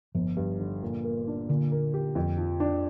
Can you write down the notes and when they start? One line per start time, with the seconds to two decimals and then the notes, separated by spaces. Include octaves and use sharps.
0.15 G1 F3
0.37 G2
0.59 D3
0.83 A#2
1.04 A#3
1.27 D4
1.49 A#2 D3
1.72 A#3
1.94 G4
2.15 F2
2.38 F3
2.60 D4